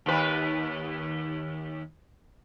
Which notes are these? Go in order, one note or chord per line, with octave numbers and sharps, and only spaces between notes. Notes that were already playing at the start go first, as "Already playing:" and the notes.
D#2 B4